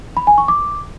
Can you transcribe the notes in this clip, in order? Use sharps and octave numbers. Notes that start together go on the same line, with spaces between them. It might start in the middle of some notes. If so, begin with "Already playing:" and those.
B5
G#5
C#6
D6